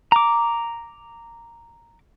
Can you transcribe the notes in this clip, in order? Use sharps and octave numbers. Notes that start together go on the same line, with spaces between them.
A#5 D6